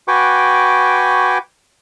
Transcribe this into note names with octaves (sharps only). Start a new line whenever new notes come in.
F#4 B4 G5 G#5 C#6 D6